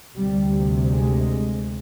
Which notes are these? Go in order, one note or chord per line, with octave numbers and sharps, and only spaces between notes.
D2 C3 G3
G#3